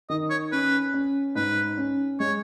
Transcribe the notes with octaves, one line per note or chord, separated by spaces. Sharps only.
D#3 D#5
C#5
C#4 B4
C#4
G#2 B4
C#4
G#3 C#5